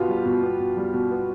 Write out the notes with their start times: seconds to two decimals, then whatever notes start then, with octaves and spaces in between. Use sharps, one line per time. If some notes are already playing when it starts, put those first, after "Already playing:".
Already playing: B2 B3 F4 G4
0.08 G3
0.25 B2
0.43 B3
0.59 B2
0.77 G3
0.93 B2
1.11 B3